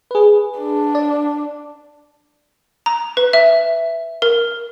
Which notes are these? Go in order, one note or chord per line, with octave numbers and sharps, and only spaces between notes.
G#4 B4
D4
D5
A#5
B4
E5
A#4